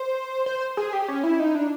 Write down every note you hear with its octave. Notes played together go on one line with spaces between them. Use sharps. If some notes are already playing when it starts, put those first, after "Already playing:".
Already playing: C5
C5
G#4
G4
C#4
E4
D#4
D4